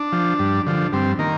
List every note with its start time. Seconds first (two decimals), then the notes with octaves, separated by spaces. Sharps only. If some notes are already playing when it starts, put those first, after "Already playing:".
Already playing: D4
0.12 F3
0.39 G2
0.67 D3 F3
0.92 G2 C4
1.19 D#3 A#3